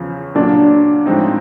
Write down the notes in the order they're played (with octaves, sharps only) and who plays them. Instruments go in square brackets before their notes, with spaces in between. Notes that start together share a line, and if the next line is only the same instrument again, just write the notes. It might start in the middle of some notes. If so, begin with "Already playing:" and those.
Already playing: [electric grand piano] E2 C#3 F3
[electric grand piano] A#2 F#3 A#3 [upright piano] D4
[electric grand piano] A2 F3 G#3 C4 D#4